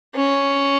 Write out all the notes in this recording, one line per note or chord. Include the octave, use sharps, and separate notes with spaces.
C#4